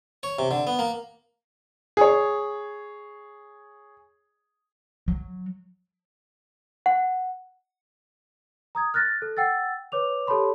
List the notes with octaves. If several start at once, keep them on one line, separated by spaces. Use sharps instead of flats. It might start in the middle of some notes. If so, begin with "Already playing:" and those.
C#5
C3
D3
B3
A#3
G#4 C#5
F#3
F#5
A#5 D#6 G#6
F6 F#6 A6 A#6
A4
F#5 G5 E6 A6
B4 C#5 D6 F7
G4 A4 C#5 A5 B5 C6